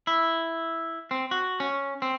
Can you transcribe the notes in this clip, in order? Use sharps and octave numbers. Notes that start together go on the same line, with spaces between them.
E4
C4
F#4
C#4
C4